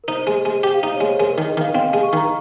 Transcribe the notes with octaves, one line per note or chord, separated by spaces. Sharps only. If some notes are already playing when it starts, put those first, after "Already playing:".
A#4
D#4 C5
G#3
G#3
G4
F5
D#4 D#5
G#3 C#5
C5
G#3 A#4
D#3 G#4
D#5
D#3 F5
C4 F5
G#3 G#5
C#6
D#3 A#5